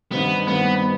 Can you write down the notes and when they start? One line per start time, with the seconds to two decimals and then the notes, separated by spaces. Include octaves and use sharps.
0.11 G2 D#3 G3 B3 C4
0.47 G2 D#3 G3 B3 C4